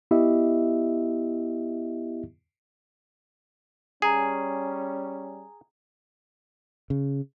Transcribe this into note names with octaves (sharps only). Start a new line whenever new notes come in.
B3 E4 G4 D#5 E5
G3 C#4 G#4 G#5 A#5
C#3